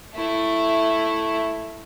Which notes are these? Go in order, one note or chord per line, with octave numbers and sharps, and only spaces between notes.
A3 E4